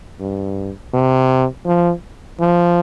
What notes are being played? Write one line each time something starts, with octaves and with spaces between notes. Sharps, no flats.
G2
C3
F3
F3